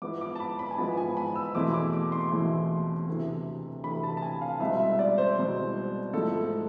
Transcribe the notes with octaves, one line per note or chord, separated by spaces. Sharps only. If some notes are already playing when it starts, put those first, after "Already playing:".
G#2 F3 B3 E4 D6
D6
A5
B5
B5
G#5
G#2 F3 B3 E4 A5
G#5
B5
E6
E2 B2 A3 C4 E4 D6
D6
D6
C6
E2 B2 A3 C4 E4
D2 C3 E3
D2 C3 E3 B5
A5
A5
G#5
F5
C2 B2 G#3 C4 E5
E5
E5
D5
C5
C2 B2 G#3 C4
G#2 F3 A3 E4 A4